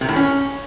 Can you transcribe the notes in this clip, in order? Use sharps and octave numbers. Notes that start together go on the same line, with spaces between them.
C3
A2
C#4